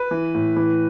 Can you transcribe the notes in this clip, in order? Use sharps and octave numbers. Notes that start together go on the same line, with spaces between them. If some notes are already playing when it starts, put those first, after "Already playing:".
Already playing: B4
E3
A2
E3